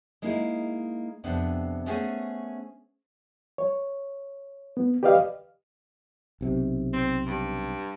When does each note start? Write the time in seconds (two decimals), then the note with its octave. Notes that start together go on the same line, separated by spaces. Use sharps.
0.22 G#3 A#3 D#4 E4 G#4
1.24 F2 C3 B3 D4
1.86 A3 B3 C#4 G#4 C5 G#5
3.58 C#5
4.77 B3
5.03 G4 B4 D5 D#5 F5
6.41 B1 C3
6.93 C4
7.27 G2